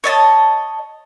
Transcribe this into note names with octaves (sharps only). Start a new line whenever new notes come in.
C#5 D#5 A5